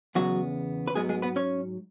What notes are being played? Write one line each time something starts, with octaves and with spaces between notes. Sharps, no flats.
E2 C#3 F#3 G#3 B3 F#4
B4
G#2 F#3 G#3 B3 G#4
G#3 G#4
B3 B4
C#4 C#5